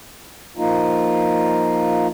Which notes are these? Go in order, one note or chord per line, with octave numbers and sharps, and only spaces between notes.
F3 A#3 D#4 F4